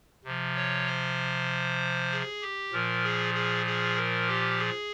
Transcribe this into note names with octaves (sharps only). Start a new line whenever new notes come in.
C3 F3
C#5
C5
G#4
G4
A#2 F3 A#4
G#4
G#4
G#4
A#4
G4
G#4